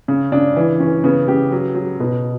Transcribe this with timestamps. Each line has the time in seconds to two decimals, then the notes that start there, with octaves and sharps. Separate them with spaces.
0.08 C#3
0.32 C#3 D4
0.56 E3
0.80 E3 C#4
1.04 C#3 B3
1.28 C#3 G4
1.52 F#3
1.75 F#3
2.00 B2